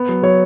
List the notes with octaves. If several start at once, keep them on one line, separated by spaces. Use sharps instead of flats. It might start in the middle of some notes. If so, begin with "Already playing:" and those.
Already playing: B3
F#3
F#3 C#5